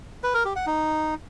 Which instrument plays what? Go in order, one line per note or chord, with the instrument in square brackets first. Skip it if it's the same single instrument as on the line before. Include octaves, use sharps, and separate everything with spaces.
[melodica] B4
A#4
G4
F#5
D#4